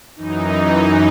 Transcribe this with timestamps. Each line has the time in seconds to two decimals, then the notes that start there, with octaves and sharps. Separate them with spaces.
0.16 F#2 E3 D#4